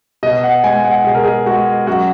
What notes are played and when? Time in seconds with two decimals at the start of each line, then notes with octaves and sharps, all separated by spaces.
0.23 B2 D#5
0.44 F#5
0.64 G#3 G#5
0.85 F#5
1.05 B2 G#4
1.15 A#4
1.23 G#4
1.46 G#3 F#4
1.87 F#2 F#4